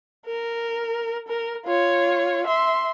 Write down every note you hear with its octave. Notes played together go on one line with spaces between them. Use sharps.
A#4
A#4
F4 C#5
E5 C6